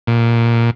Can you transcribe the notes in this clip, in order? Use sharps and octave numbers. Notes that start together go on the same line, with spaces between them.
A#2